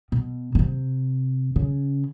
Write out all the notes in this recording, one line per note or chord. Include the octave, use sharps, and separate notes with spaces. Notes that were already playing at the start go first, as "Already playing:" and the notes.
B2
B2
C3
C#3